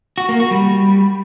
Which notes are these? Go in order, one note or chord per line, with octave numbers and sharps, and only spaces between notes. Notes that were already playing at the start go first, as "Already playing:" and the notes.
F#4
A#3
F#4
G3